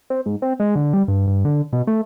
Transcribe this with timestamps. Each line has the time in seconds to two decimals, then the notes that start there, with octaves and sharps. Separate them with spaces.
0.10 C4
0.26 G#2
0.42 C4
0.60 G#3
0.76 D3
0.93 G3
1.08 G2
1.27 G2
1.45 D3
1.73 B2
1.87 A3